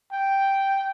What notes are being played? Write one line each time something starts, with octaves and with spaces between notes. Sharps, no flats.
G5